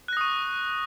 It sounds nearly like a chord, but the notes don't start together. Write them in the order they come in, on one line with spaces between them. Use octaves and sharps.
F#6 A#6 D#6 C#6